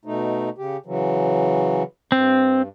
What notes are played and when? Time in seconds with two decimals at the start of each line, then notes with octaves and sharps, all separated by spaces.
0.05 B2 A3 D#4
0.58 C#3 G4
0.86 C#3 E3 F#3
2.12 G2 C4